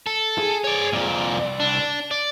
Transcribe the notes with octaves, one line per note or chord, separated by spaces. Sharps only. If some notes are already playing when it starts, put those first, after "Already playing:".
A4
G#4
C#5 D5
C2 F2 A#2 D5
D4
D5